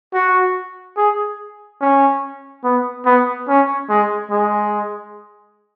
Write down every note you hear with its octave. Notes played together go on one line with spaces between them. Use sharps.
F#4
G#4
C#4
B3
B3
C#4
G#3
G#3